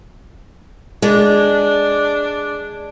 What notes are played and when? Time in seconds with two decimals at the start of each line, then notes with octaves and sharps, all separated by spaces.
1.02 G#3 D4